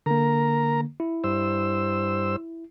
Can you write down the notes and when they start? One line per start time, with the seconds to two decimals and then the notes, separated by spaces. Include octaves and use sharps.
0.06 D3 A#3 A#4 A#5
1.00 E4
1.24 G2 C5 E6